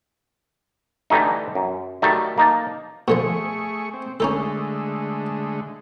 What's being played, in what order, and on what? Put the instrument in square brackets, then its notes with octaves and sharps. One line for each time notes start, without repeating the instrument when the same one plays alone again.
[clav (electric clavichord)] D3 E3 G3 A3 D#4
F#2
D#3 F#3 G3 A3
A#3 D#4 A5
[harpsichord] B2 D3 F3 [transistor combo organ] A3 G#4 C#6
[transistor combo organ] C4
[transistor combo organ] D3 G#3 A3 [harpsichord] C#4 D#4 A4